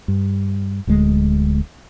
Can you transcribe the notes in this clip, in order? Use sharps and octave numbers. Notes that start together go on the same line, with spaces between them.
G2
D1 D2 G#3